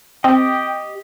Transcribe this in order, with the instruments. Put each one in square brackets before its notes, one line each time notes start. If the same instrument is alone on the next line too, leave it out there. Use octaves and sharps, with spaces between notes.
[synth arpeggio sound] C4 [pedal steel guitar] G4 D#5 [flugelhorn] G5